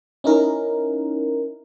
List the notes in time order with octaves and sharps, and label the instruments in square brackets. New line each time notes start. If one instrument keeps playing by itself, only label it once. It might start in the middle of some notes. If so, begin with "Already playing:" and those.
[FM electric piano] C#4 D#4 E4 A#4